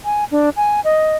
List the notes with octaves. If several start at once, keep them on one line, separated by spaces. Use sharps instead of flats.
G#5
D4
G#5
D#5